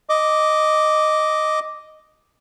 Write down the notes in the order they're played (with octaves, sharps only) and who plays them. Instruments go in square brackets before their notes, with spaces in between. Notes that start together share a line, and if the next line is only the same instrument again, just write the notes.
[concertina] D#5 D6